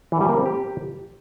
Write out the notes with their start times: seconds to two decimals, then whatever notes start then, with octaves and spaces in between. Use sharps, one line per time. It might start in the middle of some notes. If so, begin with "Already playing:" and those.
0.12 E3
0.20 G3
0.29 A#3
0.37 C4
0.46 G4